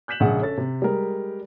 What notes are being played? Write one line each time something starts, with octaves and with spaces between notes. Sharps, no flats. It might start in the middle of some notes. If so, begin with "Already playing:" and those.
F#6 G6 B6 E7 F#7
A#1 C#3 G#3 G#4 F#5
C#4 A4 A6
C3
G3 G#3 A#4